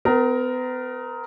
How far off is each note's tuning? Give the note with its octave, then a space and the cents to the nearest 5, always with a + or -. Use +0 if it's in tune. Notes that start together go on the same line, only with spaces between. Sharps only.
B3 +40 A#4 +0